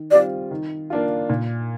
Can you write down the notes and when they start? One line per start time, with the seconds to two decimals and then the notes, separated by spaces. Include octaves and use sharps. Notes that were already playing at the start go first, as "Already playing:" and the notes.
Already playing: D#3
0.11 G3 C4 F4 D5
0.51 D#3
0.90 A#3 D4 F4
1.30 A#2